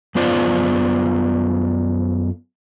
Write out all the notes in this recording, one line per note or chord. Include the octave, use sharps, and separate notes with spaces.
F#2 B3 F4 C5 D5